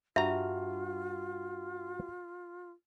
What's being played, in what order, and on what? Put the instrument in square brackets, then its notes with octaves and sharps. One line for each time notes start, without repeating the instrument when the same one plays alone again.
[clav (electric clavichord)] G2 A#5 [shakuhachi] F4 [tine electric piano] F#4 [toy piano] E5